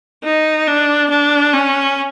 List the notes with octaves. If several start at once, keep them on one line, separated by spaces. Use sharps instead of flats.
D#4
D4
D4
C#4